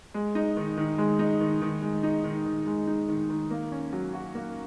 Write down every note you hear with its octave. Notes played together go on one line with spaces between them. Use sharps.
G#3
D#4
D#3
D#3
G#3
D#4
D#3
D#3
G#3
D#4
D#3
D#3
G#3
D#4
D#3
D#3
A#3
C#4
F#3
F#4
A#3